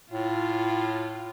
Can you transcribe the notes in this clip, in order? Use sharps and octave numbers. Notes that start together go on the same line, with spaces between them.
A2 F4